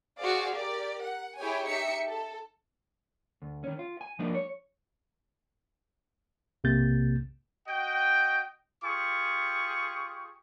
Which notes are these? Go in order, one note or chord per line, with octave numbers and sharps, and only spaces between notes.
F#4 G#4 C5 D5 F5
G4 A#4 D5
F#5
E4 G4 G#4 C#5 G5 G#5
D#4 G4 E5 C#7
A4
D2
D#3 C#4
F4
G#5
F3 F#3 G#3 A#3 D4 D#4
C#5
B1 C3 A#3 G6 A6
F#4 D#5 G5
F4 G4 G#4 C#6